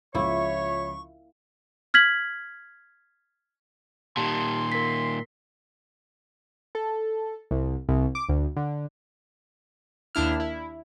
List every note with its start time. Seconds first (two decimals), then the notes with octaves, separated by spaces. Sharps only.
0.14 C#2 F3 A#3 E4 C#5 E5 B5 C#6
1.94 F6 G#6 B6 F#7
4.17 A#2 D#3 G4 A5 C6
4.72 A#4 A#6 B6
6.75 A4
7.51 C2
7.89 C2
8.15 D6
8.29 D2
8.56 D3
10.15 D#2 D4 E4 F6
10.40 E4